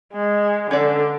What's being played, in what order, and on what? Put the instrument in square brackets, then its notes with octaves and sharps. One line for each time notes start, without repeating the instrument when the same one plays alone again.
[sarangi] G#3
[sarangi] D3 [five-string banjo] C#4 B4 D5